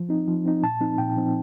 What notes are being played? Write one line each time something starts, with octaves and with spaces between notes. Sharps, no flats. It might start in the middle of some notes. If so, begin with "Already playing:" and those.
Already playing: F3
C4 D#4
F3
C4 D#4
A#2 A5
F3 C4 D#4
A#2 G5
F3 C4 D#4